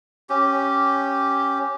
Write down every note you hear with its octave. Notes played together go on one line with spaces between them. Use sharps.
C#4 G4